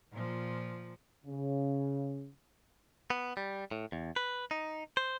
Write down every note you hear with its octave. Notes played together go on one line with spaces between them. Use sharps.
A#2 F3
C#3
B3
G3
A2
E2
B4
D#4
C5